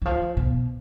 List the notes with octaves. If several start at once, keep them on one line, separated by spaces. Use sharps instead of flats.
E3
F3
B2